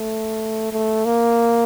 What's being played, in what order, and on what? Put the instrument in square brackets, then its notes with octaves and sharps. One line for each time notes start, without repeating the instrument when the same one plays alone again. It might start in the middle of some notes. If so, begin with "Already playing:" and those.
Already playing: [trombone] A3
A3
A#3